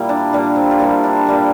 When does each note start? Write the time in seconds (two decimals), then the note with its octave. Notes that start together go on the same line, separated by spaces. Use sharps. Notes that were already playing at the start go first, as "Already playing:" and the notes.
Already playing: A#2 G3 A#3 E4
0.09 D4
0.33 A#2 G3 A#3 D4
0.56 C4
0.71 F4
0.79 A#2 G3 A#3 E4
1.04 D4
1.26 A#2 G3 A#3